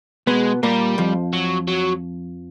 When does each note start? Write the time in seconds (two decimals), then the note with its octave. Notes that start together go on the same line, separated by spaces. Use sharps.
0.27 B2 G#3 B3
0.63 A#2 G3 A#3
0.98 F2 F3
1.33 F#3
1.68 F#3